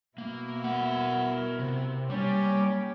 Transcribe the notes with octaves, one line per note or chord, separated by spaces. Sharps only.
B2 A#3 E4
A#4 F#5
C3
G3 A#3 C#4 G4